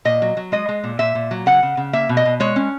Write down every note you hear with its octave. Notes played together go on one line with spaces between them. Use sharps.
A#2 D#5
F#3
F#3
G#3 D#5
G#3
A#2
A#2 E5
A#2
F#3
C#3 F#5
C#3
C#3
A#3 E5
B2
D#5
B2
G#3 C#5
C#4